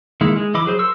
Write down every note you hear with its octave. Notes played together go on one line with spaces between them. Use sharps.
D#3 G#3 A#3 E4
G#3
E3 D#5 B5 D6
F#3 G#4 C5
A#4 C6 C#6 E6